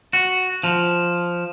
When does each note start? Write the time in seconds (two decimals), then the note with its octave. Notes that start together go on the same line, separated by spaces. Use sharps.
0.13 F#4
0.64 F3